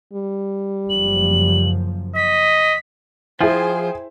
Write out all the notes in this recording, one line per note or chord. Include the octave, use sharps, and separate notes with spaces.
G3
F#1 F#2 F3 F#7
D#5 B6
F3 E4 F4 G#4 C5 G5 G#5